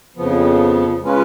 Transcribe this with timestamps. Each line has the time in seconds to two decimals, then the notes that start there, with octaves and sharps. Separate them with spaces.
0.16 F2 C#3 F3 B3
1.02 C#3 G#3 C#4 F4 B4